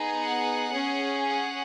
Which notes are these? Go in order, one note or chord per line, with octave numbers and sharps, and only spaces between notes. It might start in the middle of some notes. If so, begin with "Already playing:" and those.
Already playing: B3 D#4 G#4
F#5
C#4 G#4
F#5